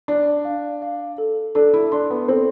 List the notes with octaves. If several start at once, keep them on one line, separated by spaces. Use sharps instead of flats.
D4 D5
F5
F5
A4
D4 A4
E4
D4 C6
B3
C4 A4